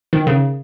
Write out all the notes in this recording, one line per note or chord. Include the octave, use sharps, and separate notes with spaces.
D#3
C#3